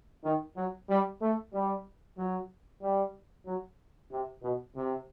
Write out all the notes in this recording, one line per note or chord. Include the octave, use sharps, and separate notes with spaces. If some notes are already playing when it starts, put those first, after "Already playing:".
D#3
F#3
G3
A3
G3
F#3
G3
F#3
C3
B2
C3